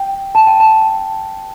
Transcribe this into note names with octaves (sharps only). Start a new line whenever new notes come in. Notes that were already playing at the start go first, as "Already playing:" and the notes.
Already playing: G5
A5
G5
A5
A5